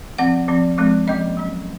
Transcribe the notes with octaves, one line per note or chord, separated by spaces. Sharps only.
F3 C4 F#5
F3 C4
F3 G#3 C4
F3 A#3 C#4 D#5
F#3 C#4